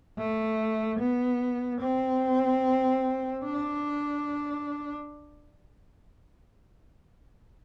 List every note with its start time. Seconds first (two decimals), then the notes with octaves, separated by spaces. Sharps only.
0.18 A3
1.00 B3
1.81 C4
3.44 D4